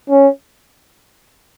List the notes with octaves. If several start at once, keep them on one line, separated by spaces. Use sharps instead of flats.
C#4